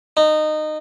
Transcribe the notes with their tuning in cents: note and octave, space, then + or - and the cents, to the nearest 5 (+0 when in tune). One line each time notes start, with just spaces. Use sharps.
D#4 -20